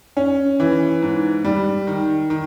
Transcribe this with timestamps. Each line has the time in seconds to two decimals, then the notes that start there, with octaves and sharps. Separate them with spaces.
0.17 C#4
0.60 E3
1.02 G#2
1.45 G3
1.87 D#3
2.30 D#3